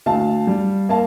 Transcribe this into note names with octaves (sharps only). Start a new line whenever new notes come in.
D2 F5 A5
G3
A#3 F5 A5